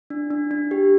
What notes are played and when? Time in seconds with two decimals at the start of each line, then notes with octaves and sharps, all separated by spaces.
0.10 D4
0.31 D4
0.51 D4
0.71 G4